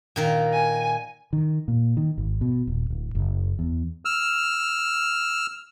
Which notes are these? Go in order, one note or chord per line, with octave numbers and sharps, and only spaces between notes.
A#2 D#3 A#4
G#5
D#3
A#2
D#3
G#1
B2
D#1
D1
F#1
E2
E6 F6